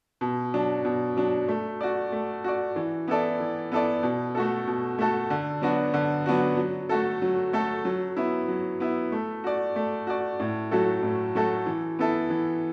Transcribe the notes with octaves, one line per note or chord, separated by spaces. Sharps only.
B2
F#3 D4
B2
F#3 D4
A3
F#4 D5
A3
F#4 D5
E3
B3 E4 A4 D5
E3
B3 E4 A4 D5
B2
A3 F#4 A4
B2
A3 F#4 A4
D3
F#3 B3 D4 F#4
D3
F#3 B3 D4 F#4
F#3
A3 F#4 A4
F#3
A3 F#4 A4
F#3
B3 E4
F#3
B3 E4
A3
F#4 D5
A3
F#4 D5
A2
F#3 A3 F#4 A4
A2
F#3 A3 F#4 A4
E3
B3 E4 A4
E3